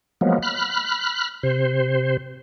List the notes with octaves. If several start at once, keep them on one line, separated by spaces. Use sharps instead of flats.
F3 F#3 G#3 A#3 B3
B5 F6 F#6
C3 C5